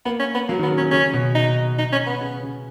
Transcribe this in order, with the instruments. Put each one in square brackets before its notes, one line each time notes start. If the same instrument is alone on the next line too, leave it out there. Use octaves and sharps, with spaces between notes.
[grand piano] A#3 [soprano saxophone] B3
[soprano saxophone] C#4
B3
[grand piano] F#3 [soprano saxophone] A#3
[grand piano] D#3
[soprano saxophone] B3
[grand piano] C#3
[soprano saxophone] C#4
[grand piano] C#3
[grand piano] C#3 [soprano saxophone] C#4
[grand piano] B2
[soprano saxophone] D#4
D#4
C#4
B3
[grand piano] C#3
C#3